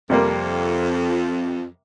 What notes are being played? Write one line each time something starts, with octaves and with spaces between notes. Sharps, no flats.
F2 C3 G3 A#3